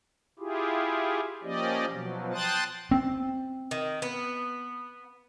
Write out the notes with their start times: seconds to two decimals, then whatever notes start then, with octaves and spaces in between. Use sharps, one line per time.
0.39 E4 F4 G4 G#4
1.43 F3 A#3 C#4 G4 D5 D#5
1.91 B2 F3 F#3
2.33 G5 A5 C6 D#6 F#6 A6
2.91 C4
3.71 D#3
4.02 B3